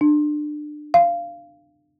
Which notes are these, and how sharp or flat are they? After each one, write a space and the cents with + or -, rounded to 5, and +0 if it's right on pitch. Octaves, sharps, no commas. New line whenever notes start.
D4 +25
F5 -15